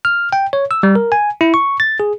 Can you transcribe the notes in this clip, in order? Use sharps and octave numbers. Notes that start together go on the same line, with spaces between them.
F6
G5
C#5
E6
G3
A#4
G#5
E4
C#6
A6
G#4